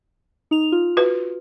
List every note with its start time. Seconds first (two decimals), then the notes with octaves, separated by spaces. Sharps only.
0.51 D#4 F7
0.72 F4
0.97 F#4 B4